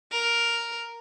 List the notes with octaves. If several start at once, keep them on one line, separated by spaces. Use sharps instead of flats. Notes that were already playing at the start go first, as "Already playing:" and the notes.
A#4